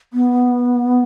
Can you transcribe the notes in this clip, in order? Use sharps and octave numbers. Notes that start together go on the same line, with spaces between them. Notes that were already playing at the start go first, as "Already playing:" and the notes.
B3